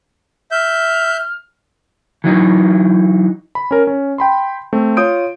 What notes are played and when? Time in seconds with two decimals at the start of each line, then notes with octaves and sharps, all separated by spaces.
0.51 E5 F6 G6
2.24 E3 F#3 D#4
3.55 B5
3.71 C#4 A#4
3.87 C#4
4.18 G5 B5 C6
4.73 A3 C4
4.97 F4 C#5 D#6 G6 D7